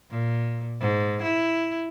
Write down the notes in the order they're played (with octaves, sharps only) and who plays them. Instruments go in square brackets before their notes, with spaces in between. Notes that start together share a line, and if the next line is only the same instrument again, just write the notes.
[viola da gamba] A#2
G#2
E4